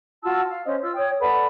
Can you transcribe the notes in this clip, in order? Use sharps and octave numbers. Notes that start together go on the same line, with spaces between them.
F4 F#4 A5 E6
F5
C#4 C5 D#5
F4 E6
C#5 G5 D#6
A4 B4 D5 F#5